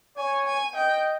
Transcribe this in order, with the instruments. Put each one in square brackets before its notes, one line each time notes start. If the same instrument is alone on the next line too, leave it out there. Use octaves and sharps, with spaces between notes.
[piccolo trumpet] C#5 [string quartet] G#5
[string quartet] G#5
[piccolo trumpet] D#5 [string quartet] G5